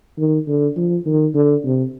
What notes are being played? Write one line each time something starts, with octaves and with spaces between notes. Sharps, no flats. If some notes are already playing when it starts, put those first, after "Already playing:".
D#3
D3
F3
D#3
D3
C3